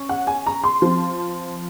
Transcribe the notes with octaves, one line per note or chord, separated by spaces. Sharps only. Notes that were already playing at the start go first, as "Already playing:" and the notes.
Already playing: C#4
F#5
G#5
A#5
C6
F3 C4